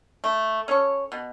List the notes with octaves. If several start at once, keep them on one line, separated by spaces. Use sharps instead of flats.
A3
C#4 A4 C#5
B2